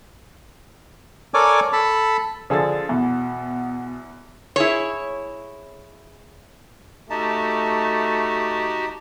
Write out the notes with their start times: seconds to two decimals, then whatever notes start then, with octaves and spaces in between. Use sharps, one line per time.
1.34 A4 A#4 C#5 D5 G#5 D6
1.73 A4 A5 B5
2.50 D3 F3 G#4 A4 A6
2.89 E2 B2 B3
4.56 E4 G#4 C#5
7.10 A3 D#4 F#4 G4 A5